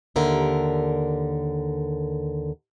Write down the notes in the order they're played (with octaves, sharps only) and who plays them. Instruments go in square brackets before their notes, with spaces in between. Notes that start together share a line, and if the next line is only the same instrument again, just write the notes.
[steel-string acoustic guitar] D#2 D3 A#4 E5